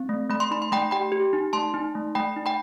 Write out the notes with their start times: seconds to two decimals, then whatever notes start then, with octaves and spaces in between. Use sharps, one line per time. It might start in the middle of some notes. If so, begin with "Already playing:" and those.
Already playing: C4
0.09 A3
0.30 A3 B5
0.40 C6
0.51 D#4 B5
0.62 C6
0.72 A3 G5 B5
0.91 G4 G5 B5
1.12 G4
1.33 D#4
1.53 A3 A5 C6
1.74 D#4
1.95 A3
2.15 A3 G5 B5
2.36 D#4
2.46 G5 B5